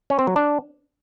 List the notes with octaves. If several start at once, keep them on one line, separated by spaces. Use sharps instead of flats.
C#4
C4
F#3
D4